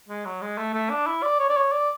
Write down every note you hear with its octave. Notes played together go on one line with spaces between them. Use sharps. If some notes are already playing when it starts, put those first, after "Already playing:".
G#3
F#3
G#3
A3
A3
D4
E4
D5
C#5
D5
C#5
D5